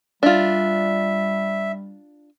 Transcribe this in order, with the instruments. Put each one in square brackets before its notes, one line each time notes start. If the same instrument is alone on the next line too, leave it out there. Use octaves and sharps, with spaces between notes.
[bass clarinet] G3 [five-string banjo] D4 F4 [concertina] E5